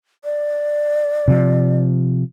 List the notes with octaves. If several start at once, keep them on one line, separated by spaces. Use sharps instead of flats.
D5
C3 F3